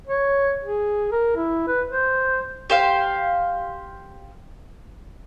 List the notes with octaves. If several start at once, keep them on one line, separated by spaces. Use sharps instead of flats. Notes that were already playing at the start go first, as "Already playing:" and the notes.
C#5
G#4
A#4
E4
B4
C5
G4 C5 F5